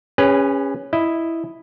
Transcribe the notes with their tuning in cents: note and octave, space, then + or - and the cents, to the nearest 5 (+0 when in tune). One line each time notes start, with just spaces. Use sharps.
C#4 +0 G#4 -35 B4 +10
E4 +0 D#5 +0